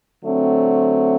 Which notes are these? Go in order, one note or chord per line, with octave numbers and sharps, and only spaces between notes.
D3 F#3 A3 C4